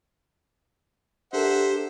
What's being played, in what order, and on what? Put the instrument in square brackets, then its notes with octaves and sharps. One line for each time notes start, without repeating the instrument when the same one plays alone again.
[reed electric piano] D4 A4 A#4 [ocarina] G4 [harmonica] C5 E5 F#5